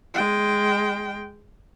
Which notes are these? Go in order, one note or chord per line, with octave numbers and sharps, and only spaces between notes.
G#3 G5